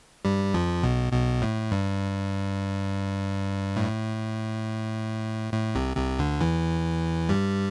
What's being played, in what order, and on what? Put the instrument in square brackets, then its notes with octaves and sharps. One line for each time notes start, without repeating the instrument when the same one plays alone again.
[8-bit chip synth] G2 G3
F2 F3
B1 B2
B1 B2
A2
G2
A2
A2
C2 C3
C2 C3
D2 D3
E2 E3
G2 G3